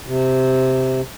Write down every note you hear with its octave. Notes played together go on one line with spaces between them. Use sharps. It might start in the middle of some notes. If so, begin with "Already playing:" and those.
C3